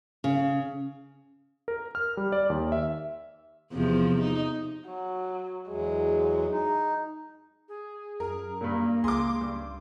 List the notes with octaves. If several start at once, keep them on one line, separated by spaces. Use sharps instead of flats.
C#3
A#4
F6
G3
D5
D#2
E5
E2 C3 F3
D#4
F#3
E2 F#3 G#3
D#4
G#4
F#2 A#4
G2 A#2 A#3
C#2 G#4 C6 D6
G2